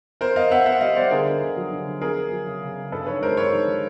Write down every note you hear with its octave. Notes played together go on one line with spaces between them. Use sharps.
B3 A#4 C5
B3 D#5 F5
B3 E5 F#5
B3 E5 F#5
G3 D#5 F5
B3 C5 D5
D3 G#4 A#4
B3
D3
F#3
D3
D3
B3 G#4 A#4
B3
F#3
C#3
C#3
B3
G2 A4 B4
D#3 B4 C#5
G#3 A#4 C5
G2 B4 C#5
D#3
D#3